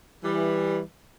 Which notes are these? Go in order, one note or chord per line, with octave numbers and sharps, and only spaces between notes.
E3 G3